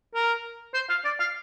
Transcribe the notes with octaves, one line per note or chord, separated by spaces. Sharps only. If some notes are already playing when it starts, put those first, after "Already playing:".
A#4
C5
F5
D5
F5